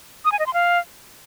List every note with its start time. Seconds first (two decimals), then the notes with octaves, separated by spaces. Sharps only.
0.25 D#6
0.32 G#5
0.39 D#5
0.46 C6
0.54 F5